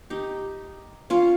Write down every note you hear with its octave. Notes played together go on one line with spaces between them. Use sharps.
D#4 G4
C#4 F4